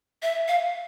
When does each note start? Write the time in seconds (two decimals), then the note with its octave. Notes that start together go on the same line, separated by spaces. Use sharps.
0.22 E5
0.48 F5